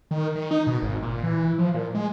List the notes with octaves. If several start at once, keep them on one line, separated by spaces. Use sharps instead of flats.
D#3
D#3
D#4
B2
G#1
A#2
E3
F3
A#2
G#3